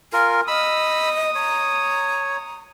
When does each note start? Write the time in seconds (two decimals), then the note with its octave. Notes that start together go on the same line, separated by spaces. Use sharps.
0.13 F4 A#4 G#5
0.48 D#5 B5 D#6 E6
1.35 C#5 A#5